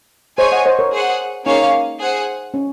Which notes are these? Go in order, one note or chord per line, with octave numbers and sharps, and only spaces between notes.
G#4 C5 C#5 D#5 G#5
D#5 F#5
C5 D#5
A#4 C#5
G#4 C5 F#5
A#3 C#4 D#4 G#4 C#5 F5
G#4 C5 F#5
C#4